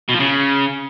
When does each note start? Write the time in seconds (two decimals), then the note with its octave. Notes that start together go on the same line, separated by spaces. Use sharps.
0.09 B2
0.14 F3
0.19 C#3